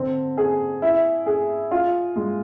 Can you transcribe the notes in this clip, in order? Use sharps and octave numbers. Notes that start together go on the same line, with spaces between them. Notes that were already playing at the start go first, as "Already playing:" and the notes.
Already playing: D3 C4
G#4
E4
G#4
F4
G#3